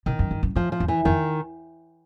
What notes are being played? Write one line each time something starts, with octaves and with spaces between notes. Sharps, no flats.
B2 D#3
F#2
G2
F#2
F2 F3
F3
E2
E3
F2 D#3